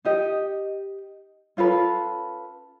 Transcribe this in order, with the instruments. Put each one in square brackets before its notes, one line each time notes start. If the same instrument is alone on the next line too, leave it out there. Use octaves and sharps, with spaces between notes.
[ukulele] D#4 G4 D#5
C#4 F4 A4 B4